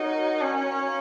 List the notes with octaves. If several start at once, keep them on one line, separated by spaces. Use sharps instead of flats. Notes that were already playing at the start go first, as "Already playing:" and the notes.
Already playing: D#4 F#4 A#4 C#5
C#4
F5 A#5